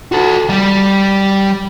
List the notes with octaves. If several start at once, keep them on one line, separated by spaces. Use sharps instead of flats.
F#4 A4
G3